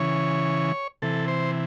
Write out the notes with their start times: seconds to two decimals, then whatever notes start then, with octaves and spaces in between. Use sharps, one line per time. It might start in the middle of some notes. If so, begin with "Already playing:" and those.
Already playing: C#3 E3 C#5
1.02 C3 E3 A4
1.28 C5